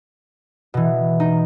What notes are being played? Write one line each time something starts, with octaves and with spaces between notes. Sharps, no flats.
B2 E3
D#4